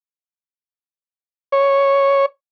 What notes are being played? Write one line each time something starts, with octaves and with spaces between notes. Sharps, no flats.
C#5